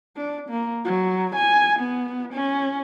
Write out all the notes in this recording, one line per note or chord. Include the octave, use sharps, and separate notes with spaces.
D4
A#3
F#3
G#5
B3
C#4